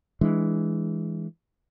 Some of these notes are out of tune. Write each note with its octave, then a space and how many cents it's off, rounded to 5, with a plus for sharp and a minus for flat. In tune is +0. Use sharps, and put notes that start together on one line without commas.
E3 +0 G#3 +0 D4 +20